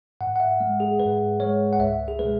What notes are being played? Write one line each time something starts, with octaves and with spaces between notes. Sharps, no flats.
G#2 F#5
F#5
E5
G#3
G#4
G#2 B4
G#3 C#5
F#5
C#2 E5
G#4
B2 G#3 B4